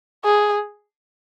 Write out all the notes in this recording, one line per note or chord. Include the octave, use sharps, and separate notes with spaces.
G#4